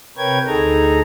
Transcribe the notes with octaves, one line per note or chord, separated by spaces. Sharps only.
C3 A#4 B4 C#5 G5 G#6
D2 D#4 G#4 A4 A#5